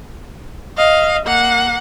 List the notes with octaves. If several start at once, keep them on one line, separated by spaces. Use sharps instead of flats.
D#5 F5
A#3 F#5